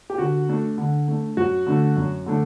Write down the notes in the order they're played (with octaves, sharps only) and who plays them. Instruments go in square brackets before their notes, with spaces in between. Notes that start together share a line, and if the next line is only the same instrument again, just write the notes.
[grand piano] G4
D3 F#4
A3 D4
D3
A3 D4
F#2 F#4
D3 A3 D4
F#2
D3 A3 D4